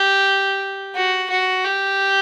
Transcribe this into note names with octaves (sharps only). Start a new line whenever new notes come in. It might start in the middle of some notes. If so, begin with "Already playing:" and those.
Already playing: G4
F#4
F#4
G4